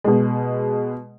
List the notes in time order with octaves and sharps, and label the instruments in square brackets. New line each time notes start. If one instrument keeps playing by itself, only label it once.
[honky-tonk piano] B2 G#3